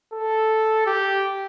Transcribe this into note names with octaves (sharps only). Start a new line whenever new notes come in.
A4
G4